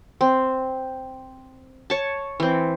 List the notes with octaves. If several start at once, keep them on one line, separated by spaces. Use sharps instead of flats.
C4
C#5 A5
E3 C4